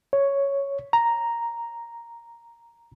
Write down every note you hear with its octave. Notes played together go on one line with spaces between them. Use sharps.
C#5
A#5